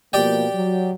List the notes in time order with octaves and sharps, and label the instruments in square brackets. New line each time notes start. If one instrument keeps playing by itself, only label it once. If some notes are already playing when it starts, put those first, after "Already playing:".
[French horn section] B2 F3 A#3 [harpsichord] G4 D5 G5
[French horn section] F#3